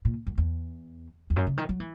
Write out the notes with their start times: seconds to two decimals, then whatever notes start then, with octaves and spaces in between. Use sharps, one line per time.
0.05 A#2
0.27 F#2
0.38 E2
1.30 E2
1.36 F#2
1.47 C#3
1.57 D#3
1.69 F#3
1.80 E3